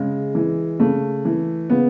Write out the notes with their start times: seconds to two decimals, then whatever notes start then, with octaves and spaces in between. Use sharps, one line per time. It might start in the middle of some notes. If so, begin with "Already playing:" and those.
Already playing: C#3 G#3
0.35 E3
0.80 C#3 A3
1.25 E3
1.70 C#3 B3